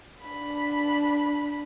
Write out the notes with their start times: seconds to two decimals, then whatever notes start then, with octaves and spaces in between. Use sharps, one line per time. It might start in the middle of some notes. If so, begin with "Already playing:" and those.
0.23 D4 B5